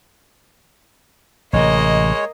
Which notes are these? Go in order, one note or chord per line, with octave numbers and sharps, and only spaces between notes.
A1 C3 G#3 A#3 C#5 D#5